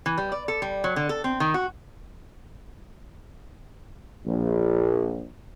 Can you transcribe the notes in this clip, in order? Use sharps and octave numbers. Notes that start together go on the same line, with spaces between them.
E3
G3
D5
A4
G3
F#3
D3
A4
C4
D#3
F#4
A#1